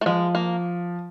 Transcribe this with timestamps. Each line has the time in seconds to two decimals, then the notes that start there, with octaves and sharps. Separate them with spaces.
0.01 A3
0.06 F3 G#3
0.35 A#3